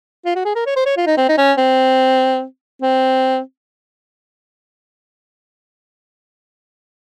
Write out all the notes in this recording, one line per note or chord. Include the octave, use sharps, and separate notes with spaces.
F4
F#4
G#4
A#4
C#5
C5
C#5
F4
D#4
C4
D#4
C#4
C4
C4